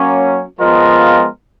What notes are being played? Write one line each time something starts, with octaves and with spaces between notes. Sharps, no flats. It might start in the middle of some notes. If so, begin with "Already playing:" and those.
Already playing: F#3 A#3 C#4
F3 G#3 B3 F4 A#4